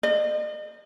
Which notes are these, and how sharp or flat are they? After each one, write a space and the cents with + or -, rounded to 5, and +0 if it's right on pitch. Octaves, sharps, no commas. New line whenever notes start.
D#5 -40